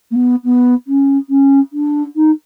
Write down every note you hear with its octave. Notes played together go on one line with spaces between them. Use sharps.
A#3
B3
B3
C#4
C#4
D4
D#4